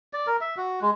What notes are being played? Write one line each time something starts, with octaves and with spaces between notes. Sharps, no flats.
D5
A#4
E5
F#4
G#3